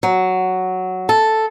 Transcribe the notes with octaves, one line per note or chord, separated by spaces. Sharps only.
F#3
A4